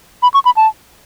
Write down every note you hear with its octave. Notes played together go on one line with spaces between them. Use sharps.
B5
C#6
B5
A5